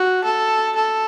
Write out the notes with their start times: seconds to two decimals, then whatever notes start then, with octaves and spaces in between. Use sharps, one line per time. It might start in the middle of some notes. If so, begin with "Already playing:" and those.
Already playing: F#4
0.24 A4
0.76 A4